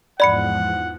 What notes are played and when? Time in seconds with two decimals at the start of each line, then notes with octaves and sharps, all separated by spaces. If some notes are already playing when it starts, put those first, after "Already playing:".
0.20 E2 G#2 F3 D5 F#5 B5 C#7